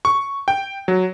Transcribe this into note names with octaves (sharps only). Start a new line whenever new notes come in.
C#6
G5
F#3